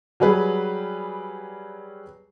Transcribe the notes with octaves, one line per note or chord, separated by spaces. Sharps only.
F#3 G3 G#4 B4